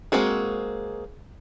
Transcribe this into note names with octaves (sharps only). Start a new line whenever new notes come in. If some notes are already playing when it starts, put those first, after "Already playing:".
G#3 A#3 C4 F#4 G#4